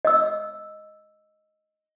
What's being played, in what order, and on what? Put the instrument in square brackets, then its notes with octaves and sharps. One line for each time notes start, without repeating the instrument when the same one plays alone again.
[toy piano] D#5 E6